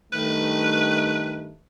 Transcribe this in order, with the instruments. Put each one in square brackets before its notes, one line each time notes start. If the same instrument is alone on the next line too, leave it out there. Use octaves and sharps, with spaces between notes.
[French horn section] G2 D#3 A3 [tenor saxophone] B4